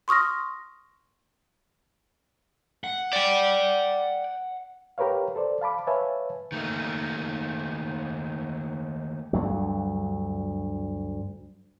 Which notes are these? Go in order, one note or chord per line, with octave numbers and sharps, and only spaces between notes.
C6 C#6 D#6 F6 A#6
F#5
D5 G5
G4 A#4 B4 C#5 F5
A4 C5 D5
F5 A5 B5 D6
B4 C#5 E5 F5 G#5 A5
D#3 A3 A#3
D2 G2 F#3